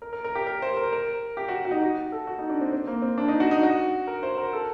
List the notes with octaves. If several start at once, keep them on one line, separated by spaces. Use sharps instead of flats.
A#4
A#4
A#4
G4
A#4
C5
A#4
A#4
G4
F#4
F#4
D#4
F#4
A4
F#4
D#4
D4
C4
C4
A#3
C4
D4
D#4
F#4
D#4
F#4
A#4
C5
A#4
A4